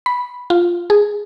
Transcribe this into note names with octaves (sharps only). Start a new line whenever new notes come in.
B5
F4
G#4